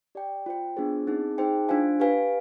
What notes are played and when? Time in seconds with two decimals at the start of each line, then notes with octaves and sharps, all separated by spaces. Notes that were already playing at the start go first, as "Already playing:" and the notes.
0.15 G4 D5 G5
0.46 F4 C5 G5
0.77 B3 D4 F4 G#4 C5
1.07 C4 D#4 G#4
1.38 D#4 G#4 C5 G5
1.69 D4 F4 C5 F5 G#5
2.00 G4 B4 F5 G#5